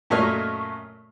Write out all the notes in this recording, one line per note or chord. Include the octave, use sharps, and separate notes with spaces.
F#2 A#2 A3 C#5 D#5 F6